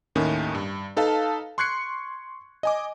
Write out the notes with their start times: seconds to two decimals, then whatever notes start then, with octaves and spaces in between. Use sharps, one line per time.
0.15 D#2 A2 D#3 C#4
0.55 G2
0.96 D#4 A4 B4 F5 A5
1.58 C6 C#6 F#6 G#6 C7 C#7
2.63 D#5 G#5 D6